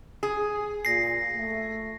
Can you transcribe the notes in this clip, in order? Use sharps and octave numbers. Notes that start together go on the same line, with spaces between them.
G#4
A#2 A#6 C7
A3